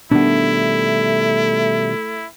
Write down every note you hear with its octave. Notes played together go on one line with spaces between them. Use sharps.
B2 D#3 G3 A3 B3 D4 E4